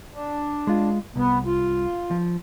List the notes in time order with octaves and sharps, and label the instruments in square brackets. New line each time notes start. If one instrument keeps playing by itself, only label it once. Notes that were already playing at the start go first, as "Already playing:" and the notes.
[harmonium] D4
[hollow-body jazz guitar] G#3 F4
[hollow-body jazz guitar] C2 [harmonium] B3
[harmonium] F4
[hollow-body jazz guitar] F3